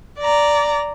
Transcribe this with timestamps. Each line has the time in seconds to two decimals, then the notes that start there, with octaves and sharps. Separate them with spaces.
0.20 D5 A#5